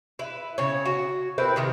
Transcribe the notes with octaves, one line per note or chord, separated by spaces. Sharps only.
E4 B4
C#3 C#5
F#4
C4 E4 A#4 B4
C3 D#3 A#4